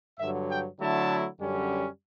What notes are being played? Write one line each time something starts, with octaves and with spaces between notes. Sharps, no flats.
G2 D3 F#3 E5
G5
D3 F#3 A3 E4 A5
F#2 D3 G3 C#4